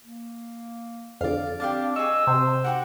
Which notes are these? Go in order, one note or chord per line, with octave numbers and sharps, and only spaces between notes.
A#3
F2 D3 D5 F5
C4 D4 G4 F5 A5
G#4 D#5 C#6 E6
C3 C5
D#4 F#4 G4 A#4 F#5